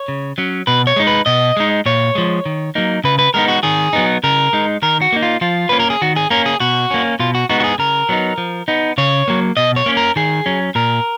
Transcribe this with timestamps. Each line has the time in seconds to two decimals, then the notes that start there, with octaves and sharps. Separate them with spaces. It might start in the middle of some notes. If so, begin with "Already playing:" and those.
Already playing: C#5
0.08 C#3
0.38 F#3 C#4
0.67 B2 B4
0.87 C#5
0.96 G#3 D#4
1.07 B4
1.26 B2 D#5
1.57 G#3 D#4
1.86 A#2 C#5
2.15 F3 G#3
2.46 D#3
2.75 F#3 A#3 D#4
3.04 C#3 B4
3.19 B4
3.34 G#3 B3 D#4 A#4
3.48 F#4
3.63 D#3 G#4
3.93 F#3 B3 D#4
4.24 C#3 A#4
4.53 G#3 D#4
4.82 D#3 A#4
5.02 F#4
5.12 A#3 D#4
5.23 F4
5.41 F3 F4
5.69 A#3 C#4 B4
5.80 A#4
5.90 G#4
6.02 D#3 F#4
6.16 G#4
6.31 A#3 C#4 A#4
6.46 G#4
6.60 B2 F#4
6.91 A#3 C#4
7.20 B2 F4
7.35 F#4
7.49 G#3 B3 D#4 F#4
7.60 F#4
7.64 G#4
7.78 C#3 A#4
8.09 F#3 B3 D#4
8.38 F3
8.68 B3 D#4
8.98 C#3 C#5
9.28 F#3 A#3
9.57 B2 D#5
9.76 C#5
9.86 A#3 C#4
9.97 A#4
10.16 D#3 G#4
10.46 F#3 C#4
10.75 A#2 A#4